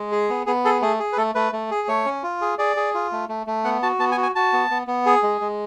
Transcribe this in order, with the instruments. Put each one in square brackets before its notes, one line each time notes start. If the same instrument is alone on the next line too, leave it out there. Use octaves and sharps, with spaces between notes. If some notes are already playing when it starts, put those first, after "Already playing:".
Already playing: [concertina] G#3
G#4
B3
B3 G#4
G#4 A4
A3 G#4
G#4
B4
A3 A4
A3 B4
A3
G#4
A3 C#5
C#4
F4
G#4
G#4 D5
G#4
F4
A3
A3
A3
B3 F#5
F#4 A5
B3 A5
G#5
F#4
G#5
F#4 A5
B3
B3
B3
G#4
G#3
G#3